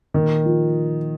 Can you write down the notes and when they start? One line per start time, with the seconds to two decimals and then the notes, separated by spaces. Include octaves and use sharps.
0.14 A#2 D#3
0.45 F3